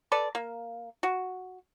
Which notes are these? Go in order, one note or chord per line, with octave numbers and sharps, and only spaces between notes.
A4 B4 D5
A#3
F#4